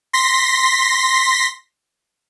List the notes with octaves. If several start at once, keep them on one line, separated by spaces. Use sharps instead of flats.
C6 A#6 B6